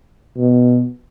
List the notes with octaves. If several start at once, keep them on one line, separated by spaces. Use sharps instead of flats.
B2